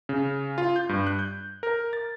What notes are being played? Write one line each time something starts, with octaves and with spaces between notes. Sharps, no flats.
C#3
F4
G6
G2
F#6
G6
A#4
A6